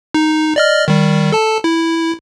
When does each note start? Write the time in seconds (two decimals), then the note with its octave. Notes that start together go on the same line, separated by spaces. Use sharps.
0.14 D#4
0.56 D5 D#5 F6
0.88 D#3 G3
1.32 A4 A5
1.64 E4